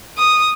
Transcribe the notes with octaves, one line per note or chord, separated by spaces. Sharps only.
D#6